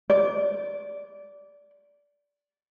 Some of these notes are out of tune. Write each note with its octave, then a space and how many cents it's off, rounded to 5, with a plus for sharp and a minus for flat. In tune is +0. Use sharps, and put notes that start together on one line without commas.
D5 -15